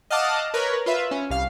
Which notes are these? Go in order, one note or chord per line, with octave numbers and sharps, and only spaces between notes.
D#5 F5 F#5 A5 D6 D#6
A#4 B4 C#5
F4 B4 E5
C#4
C2 F5